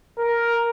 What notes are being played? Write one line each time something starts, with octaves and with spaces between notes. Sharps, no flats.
A#4